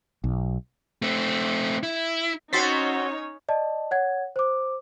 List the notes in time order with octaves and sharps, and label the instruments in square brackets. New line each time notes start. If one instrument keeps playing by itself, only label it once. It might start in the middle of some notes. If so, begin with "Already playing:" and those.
[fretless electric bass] B1
[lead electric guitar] A3 C4
E4
[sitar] C4 F#4 [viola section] C#4 D#4 C#5 [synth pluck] C6 A6 B6
[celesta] D5 D#5 A5
C#5 F#5 G#6
C5 D6